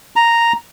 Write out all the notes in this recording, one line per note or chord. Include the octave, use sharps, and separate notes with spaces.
A#5